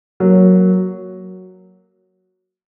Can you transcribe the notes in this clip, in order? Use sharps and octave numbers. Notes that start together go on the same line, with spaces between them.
F#3 A#3